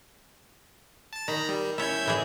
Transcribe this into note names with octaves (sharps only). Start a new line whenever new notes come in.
A5 A6
D#3 A#5 B5
G3
C#4 E4 E5 G6 G#6
A2 E3 G#4